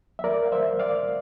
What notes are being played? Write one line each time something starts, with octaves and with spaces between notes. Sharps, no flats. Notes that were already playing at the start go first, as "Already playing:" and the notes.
E5
A#4 D5
F5
C5 E5
D5 F5